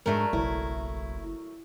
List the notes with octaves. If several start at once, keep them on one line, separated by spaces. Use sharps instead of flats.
G#2 F#3 A3 D4 A#4
F#1 B1 E4